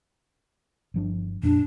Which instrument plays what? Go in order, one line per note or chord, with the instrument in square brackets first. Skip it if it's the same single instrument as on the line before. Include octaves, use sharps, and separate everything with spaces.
[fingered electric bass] G1 F3 D4
[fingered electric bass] F2 A#2 [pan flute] D4